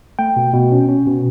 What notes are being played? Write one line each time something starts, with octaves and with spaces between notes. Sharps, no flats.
A3 G5
B2
B2
C#4
C#4
B2